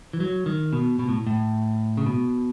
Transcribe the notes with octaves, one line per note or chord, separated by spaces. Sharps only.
E3
F#3
D#3
B2
B2
A2
A2
C#3
B2